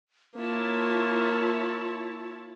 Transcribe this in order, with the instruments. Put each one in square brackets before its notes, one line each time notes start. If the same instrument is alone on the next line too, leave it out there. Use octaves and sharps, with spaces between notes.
[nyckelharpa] A#3 [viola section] E4 C#5 A5 [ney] F4